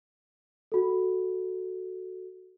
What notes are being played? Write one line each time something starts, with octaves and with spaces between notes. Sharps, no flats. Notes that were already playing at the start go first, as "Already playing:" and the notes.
F#4 A4